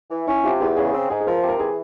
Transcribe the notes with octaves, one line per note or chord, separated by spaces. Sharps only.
E3
C#4 E4
C3 F4
E2 G4
C#3 G#4
C4
G#2 G#4
G#4
F3 A#4
C5
C3
A#4
E3 G#4